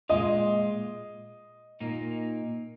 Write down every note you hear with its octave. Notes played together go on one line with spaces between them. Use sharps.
A#2 G#3 F4 D#5
A#2 A#3 D#4